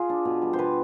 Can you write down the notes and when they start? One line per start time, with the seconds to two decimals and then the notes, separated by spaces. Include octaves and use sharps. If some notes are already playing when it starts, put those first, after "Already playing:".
Already playing: F4 G#4
0.09 D4
0.25 B2
0.42 G3
0.53 C5
0.59 B2 B4